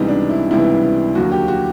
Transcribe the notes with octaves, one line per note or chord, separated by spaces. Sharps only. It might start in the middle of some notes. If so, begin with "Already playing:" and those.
Already playing: C#2 C3 E3 G3 B3 D#4
D4
E4
C#2 C3 E3 G3 B3 E4
D#2 D3 F#3 A#3 F#4
G4
F#4